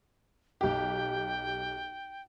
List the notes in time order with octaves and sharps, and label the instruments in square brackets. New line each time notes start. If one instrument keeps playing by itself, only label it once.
[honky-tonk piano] B1 G4 [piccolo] G5